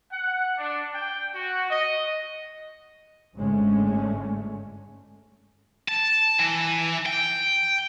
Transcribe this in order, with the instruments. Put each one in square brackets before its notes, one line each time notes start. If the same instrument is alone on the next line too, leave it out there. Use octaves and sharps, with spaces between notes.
[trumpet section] F#5
D4
G5
F#4
D#5
[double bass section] G1 G#2 D3 G#3 A3 C#4
[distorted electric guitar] A5
E3
G5